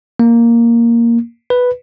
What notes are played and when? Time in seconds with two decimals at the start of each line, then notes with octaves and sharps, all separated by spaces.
0.20 A#3
1.50 B4